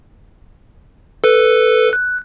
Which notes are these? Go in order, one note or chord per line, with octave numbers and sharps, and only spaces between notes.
A4 B4
F#6